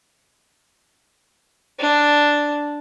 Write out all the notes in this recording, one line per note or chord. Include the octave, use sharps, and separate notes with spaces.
D4